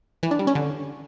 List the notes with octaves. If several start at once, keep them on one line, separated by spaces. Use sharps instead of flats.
E3
D4
G3
C#4
D3